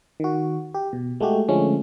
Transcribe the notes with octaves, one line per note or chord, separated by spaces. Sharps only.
D#3 F#4
G4
B2
G#3 A3 F#4 G4
D3 F3 G#3 A3 C#4